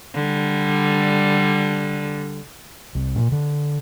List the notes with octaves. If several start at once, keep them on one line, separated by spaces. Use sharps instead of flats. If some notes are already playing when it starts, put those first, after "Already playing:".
D3 G3
C2
A#2
D3